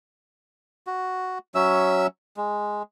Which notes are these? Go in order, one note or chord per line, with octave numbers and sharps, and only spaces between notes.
F#4
F#3 C#4 E5 E6
G#3